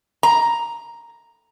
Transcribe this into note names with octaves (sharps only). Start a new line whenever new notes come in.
A#5